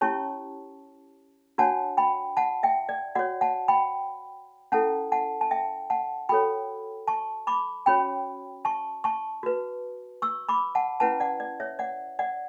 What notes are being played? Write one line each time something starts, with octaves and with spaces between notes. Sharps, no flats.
C#4 E4 G4 C#5 A5 C#6
D4 F#4 C#5 F#5 A5
G5 B5
F#5 A5
E5 G5
D5
F#4 C#5 D5 F#5
F#5 A5
G5 B5
C#4 E4 A4 F#5 A5
F#5 A5
A5
E5 G5
F#5 A5
F#4 A4 C#5 G5 B5
A5 C#6
B5 D6
C#4 F#4 C#5 G5 B5
A5 C#6
A5 C#6
F#4 B4
C#6 E6
B5 D6
F#5 A5
C#4 E4 B4 F#5 A5
D5 F#5
D5
C#5 E5
D5 F#5
D5 F#5